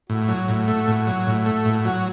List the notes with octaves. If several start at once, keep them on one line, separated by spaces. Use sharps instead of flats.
A2 F#4
F#3
A2
A3
A2
F#3
A2
A3
A2
F#3 F#4